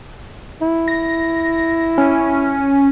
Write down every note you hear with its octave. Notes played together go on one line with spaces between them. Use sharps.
E4
A#6
C#4